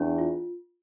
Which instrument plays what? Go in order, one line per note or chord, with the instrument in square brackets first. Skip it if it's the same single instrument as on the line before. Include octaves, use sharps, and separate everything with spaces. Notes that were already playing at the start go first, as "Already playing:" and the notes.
Already playing: [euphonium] E2 [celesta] D4
[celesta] F4